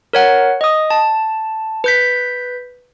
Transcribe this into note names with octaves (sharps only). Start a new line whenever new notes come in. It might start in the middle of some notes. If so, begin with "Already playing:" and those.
A#4 C#5 F#5
D#5 D#6
A5
B4 G6 B6